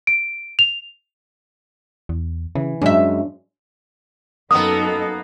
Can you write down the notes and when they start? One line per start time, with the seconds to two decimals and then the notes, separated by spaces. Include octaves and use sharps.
0.07 D7
0.59 F7
2.09 E2
2.55 C#3 E3
2.82 F#2 F#3 G#3 C#4 D4 E5
4.51 F#2 A#3 B3 D#4 A4 D#6